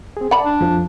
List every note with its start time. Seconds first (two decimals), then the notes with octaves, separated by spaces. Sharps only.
0.17 C4 G#4
0.31 D5 F#5 A5 B5
0.45 D4
0.61 F2 F3